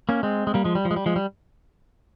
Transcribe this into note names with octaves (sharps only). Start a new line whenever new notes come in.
A#3 C#4
G#3 C4
G#3
G3 A#3
F3 G#3
G3
F3
G#3
G3
F3 G#3
G3